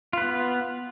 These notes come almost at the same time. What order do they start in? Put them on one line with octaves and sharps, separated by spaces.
F4 B4 B3